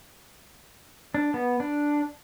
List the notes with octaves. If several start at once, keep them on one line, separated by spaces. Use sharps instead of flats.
D4
B3
D4